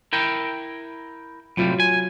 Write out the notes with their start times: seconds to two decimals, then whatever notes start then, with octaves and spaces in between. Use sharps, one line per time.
0.13 E4 A#4 G5
1.57 A2 C3 F#3 G3 F4
1.80 G#5